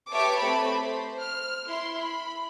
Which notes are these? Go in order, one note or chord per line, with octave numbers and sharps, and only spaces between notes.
G4 B4 C#5 E5 A5 D6
A3 C4 A5 B5
C5
F6
E4 C6
B5